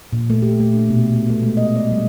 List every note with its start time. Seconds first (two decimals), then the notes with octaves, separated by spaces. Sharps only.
0.13 A#2
0.30 A3
0.42 G4
0.60 A3
0.74 D4
0.90 B2
1.15 B3
1.30 A3
1.43 G#3
1.57 D#5
1.76 D5
1.92 G3